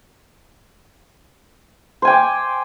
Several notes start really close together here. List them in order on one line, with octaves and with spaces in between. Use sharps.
C5 G#5 G5 D6